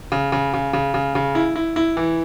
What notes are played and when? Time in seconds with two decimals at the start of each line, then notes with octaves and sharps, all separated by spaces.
0.12 C#3
0.32 C#3
0.54 C#3
0.73 C#3
0.94 C#3
1.15 C#3
1.35 E4
1.56 E4
1.76 E4
1.97 E3